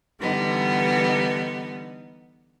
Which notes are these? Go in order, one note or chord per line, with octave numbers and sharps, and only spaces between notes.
D3 E3 G3 B3 D#4